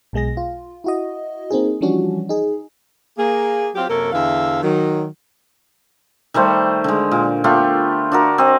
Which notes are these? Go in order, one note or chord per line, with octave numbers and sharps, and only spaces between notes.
B1 B2 G#3 G#4 A#6
F4
E4 F#4 D#5
A#3 C4 D#4 G#4
E3 F3 G3 C#4 D4 F#4
D#4 G#4
A#3 G#4
F#3 C4 F4 G4
F#2 C3 A#3 A4 A#4 C#5
E2 D3 E3 E5 F5
D#3 F#3
D#3 G3 A3 C5
D3 G#3
A#2
A3 B3 F4 G4
D4 F#4 A#4
C4 D#5